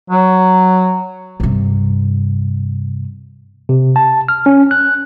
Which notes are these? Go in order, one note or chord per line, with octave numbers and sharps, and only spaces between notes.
F#3
G2 C3
C3
A5
F6
C#4
F#6